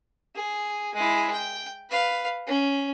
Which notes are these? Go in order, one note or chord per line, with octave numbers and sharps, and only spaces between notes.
G#4
G#3 E4
G5
B4 F5
C#4